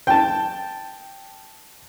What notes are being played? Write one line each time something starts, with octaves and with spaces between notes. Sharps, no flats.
G5 A5